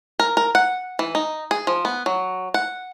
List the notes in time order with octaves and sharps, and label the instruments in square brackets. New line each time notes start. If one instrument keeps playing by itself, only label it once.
[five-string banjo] A#4
A#4
F#5
E3
D#4
G#4
F3
B3
F#3
F#5